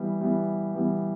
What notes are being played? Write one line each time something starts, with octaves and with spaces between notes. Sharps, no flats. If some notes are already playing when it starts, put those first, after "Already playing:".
Already playing: E3 G3 B3
E3 G3 B3
E3 G3 B3